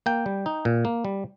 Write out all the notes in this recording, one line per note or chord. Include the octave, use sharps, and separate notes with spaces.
A#3 G5
G3
D#4
A#2
A#3
G3